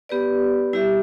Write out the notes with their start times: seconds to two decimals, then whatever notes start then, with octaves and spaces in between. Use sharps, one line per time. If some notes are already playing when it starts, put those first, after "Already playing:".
0.09 B3 G4 B4 D5
0.73 G3 E4 G4 E5